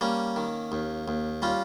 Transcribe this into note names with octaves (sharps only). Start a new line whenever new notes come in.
G3 A#3 C#4
D#3
D#2
D#2
G3 C#4 F4